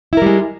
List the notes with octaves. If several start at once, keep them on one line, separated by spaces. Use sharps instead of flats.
G3 G#3 E4 A#4